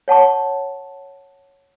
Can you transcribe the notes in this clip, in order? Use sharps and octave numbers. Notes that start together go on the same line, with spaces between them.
C#5 F#5 A5 C#6